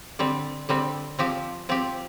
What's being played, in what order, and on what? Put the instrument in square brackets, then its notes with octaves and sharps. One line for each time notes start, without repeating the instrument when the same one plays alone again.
[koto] D3 G3 C4
D3 G3 C4
F3 C4 G4
F3 C4 G4